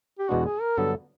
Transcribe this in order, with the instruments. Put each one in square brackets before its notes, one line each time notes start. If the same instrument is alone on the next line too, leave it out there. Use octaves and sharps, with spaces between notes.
[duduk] G4
[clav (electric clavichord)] E2 B2 G#3 B3 D4 [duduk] F#4
[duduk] G#4
A#4
[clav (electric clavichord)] G2 D3 F#3 B3 [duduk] A4